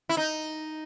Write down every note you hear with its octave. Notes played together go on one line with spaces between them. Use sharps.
E4
D#4